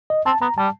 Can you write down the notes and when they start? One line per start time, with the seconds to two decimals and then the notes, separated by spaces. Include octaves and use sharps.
0.10 D#5
0.26 C4 A5
0.42 B3 A#5
0.58 G3 A5